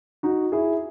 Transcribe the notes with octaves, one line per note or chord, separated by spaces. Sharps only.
D#4 F#4
E4 G#4